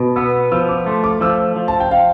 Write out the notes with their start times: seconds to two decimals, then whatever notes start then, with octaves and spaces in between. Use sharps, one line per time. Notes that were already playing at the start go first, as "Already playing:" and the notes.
Already playing: B2
0.16 B3 E6
0.52 F3 E6
0.69 D6
0.86 A3 C6
1.04 D6
1.21 F3 E6
1.56 F3
1.68 A5
1.80 G5
1.91 F5